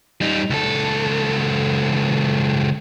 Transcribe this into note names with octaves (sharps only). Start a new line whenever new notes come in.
G3 D#4
C#2 A4